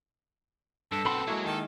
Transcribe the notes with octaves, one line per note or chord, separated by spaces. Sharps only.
G2 A4
B1 B3 C4 B5 C6
F#3 G#3 A#3 E4 F#4
D#3 A4